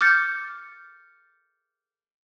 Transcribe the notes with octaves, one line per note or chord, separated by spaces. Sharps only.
D6 F6 G6 A6 C#7